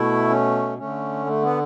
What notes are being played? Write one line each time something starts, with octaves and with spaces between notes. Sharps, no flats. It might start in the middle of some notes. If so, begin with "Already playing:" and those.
Already playing: B2 A3 E4
C#4
D3 A3 C#4
A3
B3